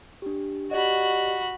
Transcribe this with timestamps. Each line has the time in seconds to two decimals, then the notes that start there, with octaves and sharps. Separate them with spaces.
0.22 D4 G4
0.71 F#4 G4 D5 D#5 B5